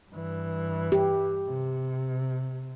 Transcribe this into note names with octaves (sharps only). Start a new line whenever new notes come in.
G2 E3
G4
C3